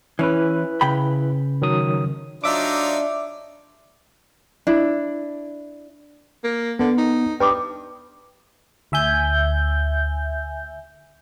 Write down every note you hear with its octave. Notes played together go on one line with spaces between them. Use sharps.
E3 C#4 E4 B4
C#3 G5 B5
D#3 F#3 D#6
F#3 D4 D#4 F4 D5 E5 D6
D4 E4
A#3
D3 B3
D#4
G2 B4 G5 D6 D#6
D2 E5 G#5 G6